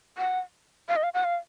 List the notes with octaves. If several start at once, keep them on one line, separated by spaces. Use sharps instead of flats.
F#5
F5
D#5
F5
F#5
F5